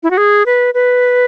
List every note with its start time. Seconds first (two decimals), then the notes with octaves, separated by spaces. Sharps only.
0.03 E4
0.11 F#4
0.17 G#4
0.46 B4
0.74 B4